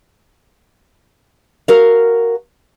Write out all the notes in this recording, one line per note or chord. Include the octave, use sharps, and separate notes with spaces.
F#4 A#4 F5